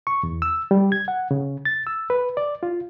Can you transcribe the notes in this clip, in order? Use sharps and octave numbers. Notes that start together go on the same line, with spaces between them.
C#6
E2
E6
G3
G#6
F#5
C#3
A6
E6
B4
D5
F4